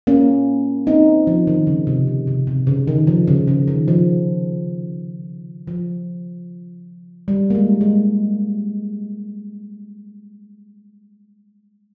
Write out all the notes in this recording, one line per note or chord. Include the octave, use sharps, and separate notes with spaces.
A#3 C#4
C4 D#4
F3
D#3
C#3
C3
C#3
C3
C3
C#3
D#3
F3
C#3
C#3
D#3
F3
F3
G3
A#3
G#3
G#3